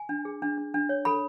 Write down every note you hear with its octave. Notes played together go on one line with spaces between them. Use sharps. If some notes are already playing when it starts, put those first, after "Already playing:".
Already playing: G#5
D4
G#4
D4
D4
D4
C#5
A4 B5